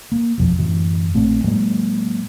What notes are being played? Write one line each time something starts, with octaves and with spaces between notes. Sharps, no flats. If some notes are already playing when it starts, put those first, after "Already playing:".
A#3
E1 A#1 F2 F3
F#2 A2 E3
A#1 A2 A3 C4
A2 F#3 G#3 A#3